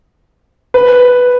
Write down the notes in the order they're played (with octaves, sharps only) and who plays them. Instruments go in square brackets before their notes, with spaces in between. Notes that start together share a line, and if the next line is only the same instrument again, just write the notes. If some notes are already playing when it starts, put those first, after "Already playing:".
[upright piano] B4